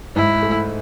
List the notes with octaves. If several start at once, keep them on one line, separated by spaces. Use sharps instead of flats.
G#2 E4
A3